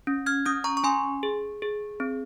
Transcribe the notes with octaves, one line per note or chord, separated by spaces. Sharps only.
C#4
F6 G#6
C#4 D#6 G6
A#5 C#6
C#6
C#4 G#5 C6
G#4
G#4
C4